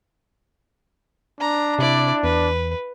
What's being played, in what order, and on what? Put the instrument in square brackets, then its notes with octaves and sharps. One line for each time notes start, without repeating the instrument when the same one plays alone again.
[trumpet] D4 [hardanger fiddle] A#5
[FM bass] C3 [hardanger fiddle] E4 D5
[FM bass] E2 [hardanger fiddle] B4